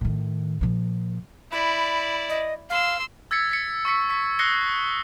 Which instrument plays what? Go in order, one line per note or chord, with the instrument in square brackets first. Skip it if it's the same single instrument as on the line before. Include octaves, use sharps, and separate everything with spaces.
[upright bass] A2 D#3
A#2 F3
[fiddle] E4 D5 [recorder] B5
[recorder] D#5
[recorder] F5 [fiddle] C6 E6
[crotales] E6 G#6 A6 B6 C#7
A6 B6 C#7
C#6 E6 B6 C#7
C#6 B6
D#6 F#6 A#6 C7 C#7 G7